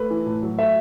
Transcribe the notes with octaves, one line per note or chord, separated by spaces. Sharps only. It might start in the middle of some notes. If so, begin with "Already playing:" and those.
Already playing: A3 B4
E3
A2
F#3
A3 E5